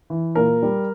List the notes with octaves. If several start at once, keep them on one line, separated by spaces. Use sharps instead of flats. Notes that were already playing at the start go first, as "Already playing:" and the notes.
E3
A#2 A#4
G3